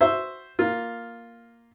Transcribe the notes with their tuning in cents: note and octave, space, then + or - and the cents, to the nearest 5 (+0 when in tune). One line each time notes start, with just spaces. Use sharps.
F#4 +5 C5 +0 E5 +0
A#3 +0 F4 +0